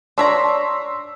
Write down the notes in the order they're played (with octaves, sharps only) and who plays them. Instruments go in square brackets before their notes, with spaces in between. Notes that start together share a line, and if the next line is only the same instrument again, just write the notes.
[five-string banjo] D4 C#5 A#5 [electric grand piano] C6 E6 B6